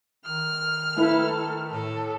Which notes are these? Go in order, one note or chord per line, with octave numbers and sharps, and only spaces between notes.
D#3 F6
A3 E4 A4 B4
A2 A4